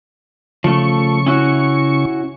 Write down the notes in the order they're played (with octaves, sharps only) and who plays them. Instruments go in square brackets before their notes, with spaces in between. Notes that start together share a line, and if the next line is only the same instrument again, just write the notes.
[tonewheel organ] C#3 C#6 [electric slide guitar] F3 A3
[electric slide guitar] C#4 E4 F#4